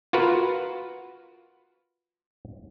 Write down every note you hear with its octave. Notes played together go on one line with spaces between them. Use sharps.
F4 F#4 A#4 B4